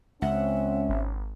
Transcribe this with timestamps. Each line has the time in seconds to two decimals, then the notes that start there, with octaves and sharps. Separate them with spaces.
0.22 C#2 C4 C#4 E5 F#5
0.89 G#1